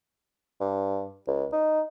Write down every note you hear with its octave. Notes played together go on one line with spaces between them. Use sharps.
G2
C#2
D#4